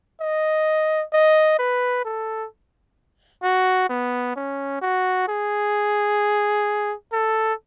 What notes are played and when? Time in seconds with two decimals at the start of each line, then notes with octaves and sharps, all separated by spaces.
0.21 D#5
1.13 D#5
1.59 B4
2.05 A4
3.43 F#4
3.90 B3
4.36 C#4
4.81 F#4
5.28 G#4
7.12 A4